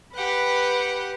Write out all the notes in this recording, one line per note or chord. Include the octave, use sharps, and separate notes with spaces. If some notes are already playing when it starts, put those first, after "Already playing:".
G4 B4 F#5